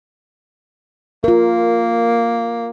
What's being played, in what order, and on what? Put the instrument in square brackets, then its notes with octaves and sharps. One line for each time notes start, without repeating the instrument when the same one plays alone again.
[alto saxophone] A#3 [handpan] F4 A#4